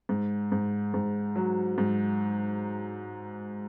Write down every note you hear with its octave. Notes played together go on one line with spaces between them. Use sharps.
G#2
G#2
G#2
F#3
G#2